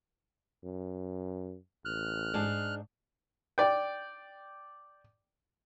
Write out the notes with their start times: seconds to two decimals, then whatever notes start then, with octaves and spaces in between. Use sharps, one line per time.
0.64 F#2
1.85 A1 F6 F#6
2.34 G#2 D4 G#4
3.58 D5 G5